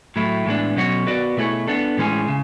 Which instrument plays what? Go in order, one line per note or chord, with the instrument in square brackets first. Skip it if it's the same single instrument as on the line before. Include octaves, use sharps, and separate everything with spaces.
[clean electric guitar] A2 F#3 A3 E4
A2 E3 G#3 B3 D4
B2 F#3 C#4 F#4 C#5
B3 F#4 B4 D5
B2 A3 E4 G#4 C#5
B3 D4 A4
A2 E3 G#3 C#4 G#4
C#3